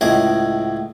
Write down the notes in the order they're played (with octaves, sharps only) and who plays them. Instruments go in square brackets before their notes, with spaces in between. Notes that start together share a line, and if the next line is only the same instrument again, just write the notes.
[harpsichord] C#2 A2 G#4 D#5 D6